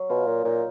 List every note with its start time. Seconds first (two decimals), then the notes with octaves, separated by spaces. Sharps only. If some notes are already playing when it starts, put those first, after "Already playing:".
Already playing: F#3
0.09 B2 F4
0.27 A#2
0.44 A#2 D#4